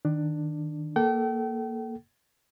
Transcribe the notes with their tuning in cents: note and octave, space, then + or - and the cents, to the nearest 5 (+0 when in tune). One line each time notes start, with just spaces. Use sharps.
D#3 +0 D4 +15
A#3 +0 A4 -15 G5 -40